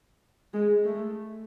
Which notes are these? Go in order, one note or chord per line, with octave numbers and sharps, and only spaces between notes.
G#3
A3